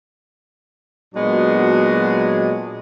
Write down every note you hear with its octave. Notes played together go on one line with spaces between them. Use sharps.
A#2 F#3 G#3 B3 D4 F#4